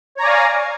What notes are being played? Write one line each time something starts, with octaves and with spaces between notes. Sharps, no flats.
C#5 D5 F5 G#5 A#5